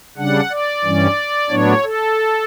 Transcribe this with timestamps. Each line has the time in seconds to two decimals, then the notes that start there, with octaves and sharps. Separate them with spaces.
0.17 C#3 G3 D4 F#5
0.50 D5
0.84 G2 E3 G3 C#4
1.50 A2 F#3 B3 D4 C#5
1.83 A4